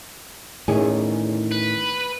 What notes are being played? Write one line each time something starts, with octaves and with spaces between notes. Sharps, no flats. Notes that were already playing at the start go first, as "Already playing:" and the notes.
E2 A2 D#3 C#4 G#4
B4